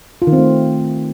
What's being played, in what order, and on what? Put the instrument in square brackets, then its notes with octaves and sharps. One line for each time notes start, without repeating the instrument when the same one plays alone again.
[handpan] F4
D#3
C4
A3